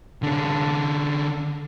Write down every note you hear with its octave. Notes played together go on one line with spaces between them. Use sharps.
D3 C#4